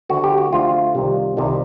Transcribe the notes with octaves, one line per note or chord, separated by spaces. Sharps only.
D2 D3 F3 A3 F#4
G4
F#4
D2 D3 F3 A3 F4
C2 C3 D#3 G3
C2 C3 D#3 G3